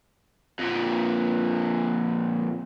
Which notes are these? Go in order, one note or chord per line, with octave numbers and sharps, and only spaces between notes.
F2 A#2